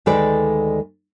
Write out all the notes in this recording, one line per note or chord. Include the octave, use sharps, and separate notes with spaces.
D2 D#3 G#3 A4 B4 D5